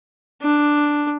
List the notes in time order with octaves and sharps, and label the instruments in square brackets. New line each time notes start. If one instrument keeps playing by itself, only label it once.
[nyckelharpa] D4